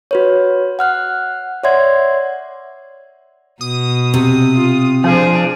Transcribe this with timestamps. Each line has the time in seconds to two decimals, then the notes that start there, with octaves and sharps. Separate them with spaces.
0.11 F#4 B4 C#5
0.79 F#5 F6 F#6
1.63 C#5 D5 E5 F#5 C6 G#6
3.61 B2 D#6
4.14 C3
4.55 F4
5.04 F3 D4 G#4